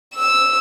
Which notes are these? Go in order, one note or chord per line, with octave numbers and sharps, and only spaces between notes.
E6